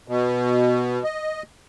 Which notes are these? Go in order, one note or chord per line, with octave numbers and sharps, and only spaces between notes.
B2
D#5